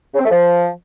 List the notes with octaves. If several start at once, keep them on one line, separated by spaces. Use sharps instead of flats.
C#3
C4
A3
F3